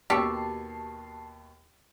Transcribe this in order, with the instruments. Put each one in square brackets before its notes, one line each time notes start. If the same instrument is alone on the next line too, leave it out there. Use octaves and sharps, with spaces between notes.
[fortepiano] D#2 B2 C#6 [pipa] G4 A4 [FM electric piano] A5 C7